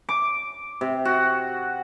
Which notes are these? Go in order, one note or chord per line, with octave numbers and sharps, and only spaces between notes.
D6
C3
F#4